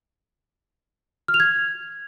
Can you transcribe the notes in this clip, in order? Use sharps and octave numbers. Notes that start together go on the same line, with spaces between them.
F6
F7
G#6